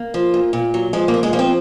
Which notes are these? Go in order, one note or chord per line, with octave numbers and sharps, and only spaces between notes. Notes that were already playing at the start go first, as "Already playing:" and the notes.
Already playing: A#3
F3
A#2
A#2
F#3
F3 G#3
A#3
A#2
G#3
F3 A#3
C4